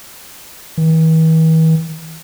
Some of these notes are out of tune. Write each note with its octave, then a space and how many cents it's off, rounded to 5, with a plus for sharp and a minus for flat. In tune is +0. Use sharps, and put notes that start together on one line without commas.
E3 -45